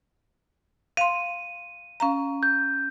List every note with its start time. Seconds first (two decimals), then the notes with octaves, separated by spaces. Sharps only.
0.97 F5 C6 D#7
2.00 C#4 F5 A#5
2.43 G6